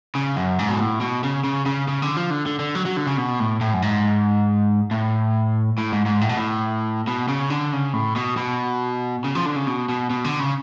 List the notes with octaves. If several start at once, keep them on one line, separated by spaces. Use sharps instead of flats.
C#3
F#2
G#2
B2
A2
B2
C#3
C#3
C#3
C#3
D3
F3
D3
D3
D3
F#3
F#3
D3
C#3
B2
A2
A2
F#2
G#2
A2
A2
G#2
G#2
A2
B2
A2
B2
C#3
D3
C#3
A2
B2
B2
C#3
F3
D3
C#3
B2
B2
B2
D3
C#3